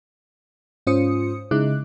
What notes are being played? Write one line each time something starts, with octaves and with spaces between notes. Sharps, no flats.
G#2 C#4 F4 C5 D#6 C#7
C#3 G#3 D#4 E4 D6 F#6